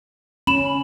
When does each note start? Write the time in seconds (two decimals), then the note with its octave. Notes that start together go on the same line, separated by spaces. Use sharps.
0.47 C#4 B5 E7